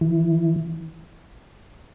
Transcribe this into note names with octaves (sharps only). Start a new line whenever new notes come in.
E3